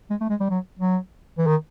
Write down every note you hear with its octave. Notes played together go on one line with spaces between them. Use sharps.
G#3
A3
G#3
G3
F#3
F#3
E3
D#3